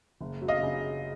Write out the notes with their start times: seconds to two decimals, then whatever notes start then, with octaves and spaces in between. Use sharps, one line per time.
0.21 F#1
0.42 F#3
0.48 D#5 F5
0.63 C#3